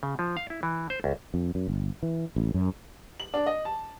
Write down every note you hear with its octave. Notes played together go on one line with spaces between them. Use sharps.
C#3
F3
F5
E4
E3
C5
C#2
F2
F#2
G1
E3
A1
F#2
F#7
D4
D#5
A5